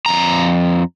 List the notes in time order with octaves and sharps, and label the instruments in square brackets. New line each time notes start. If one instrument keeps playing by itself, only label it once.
[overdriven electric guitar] F2 A#5